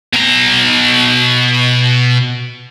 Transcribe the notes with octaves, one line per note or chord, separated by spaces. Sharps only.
B2 A#5